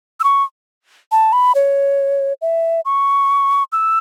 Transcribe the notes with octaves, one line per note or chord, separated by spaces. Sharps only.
E6
C#6
A5
B5
C#5
E5
C#6
E6